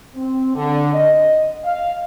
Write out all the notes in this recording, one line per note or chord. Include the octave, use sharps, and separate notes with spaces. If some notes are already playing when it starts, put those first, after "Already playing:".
C4
D3
D#5
F5